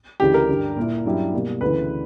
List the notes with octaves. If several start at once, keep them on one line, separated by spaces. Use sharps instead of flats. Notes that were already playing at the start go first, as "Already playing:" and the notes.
D2 C#3 E3 G4
A#4
G2 D3 G3
A#2 A#3 E4
G2 F#3 C#4 E4 G4
B2 G3 A#3
D2 C#3 E3 B4